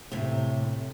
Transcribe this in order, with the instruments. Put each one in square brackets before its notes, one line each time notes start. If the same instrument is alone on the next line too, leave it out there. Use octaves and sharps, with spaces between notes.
[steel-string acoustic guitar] A2 C3